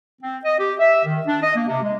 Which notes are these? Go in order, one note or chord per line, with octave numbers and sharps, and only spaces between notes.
C4
D#5
G4
E5
D#3
D4
D#5
A#3
C3
G#3